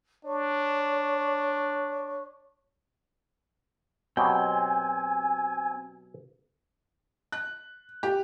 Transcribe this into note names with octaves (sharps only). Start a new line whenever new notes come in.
D4 C#5 C#6
B2 F#3 C4 G4 G5 G#5
F#6
G4